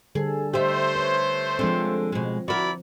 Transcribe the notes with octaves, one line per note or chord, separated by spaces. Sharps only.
D3 G3 G#4 A4
A3 G4 C5 D#5 E5
B4 C#5
D3 F3 G#3 C4
B2 G#3
E4 F#4 A#4 D5 B5